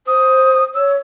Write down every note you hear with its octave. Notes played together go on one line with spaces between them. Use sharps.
C5 D#6
C#5 E6